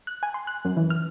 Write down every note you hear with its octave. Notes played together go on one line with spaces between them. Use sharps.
F#6
G#5
C6
F#6
F#2
E3
F6